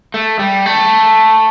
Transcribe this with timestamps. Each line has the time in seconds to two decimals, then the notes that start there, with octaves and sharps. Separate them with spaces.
0.14 A3
0.39 G3
0.66 A3